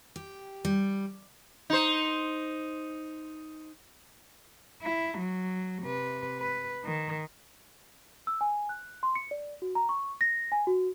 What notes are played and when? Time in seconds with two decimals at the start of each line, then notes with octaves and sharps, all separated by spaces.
0.16 G4
0.65 G3
1.70 D#4 C5
4.82 E4
5.19 F#3
5.83 C3 B4
6.40 B4
6.84 D#3
8.27 E6
8.41 G#5
8.69 F#6
9.03 C6
9.15 C#7
9.31 D5
9.62 F#4
9.75 A#5
9.89 C#6
10.21 A#6
10.52 G#5
10.67 F#4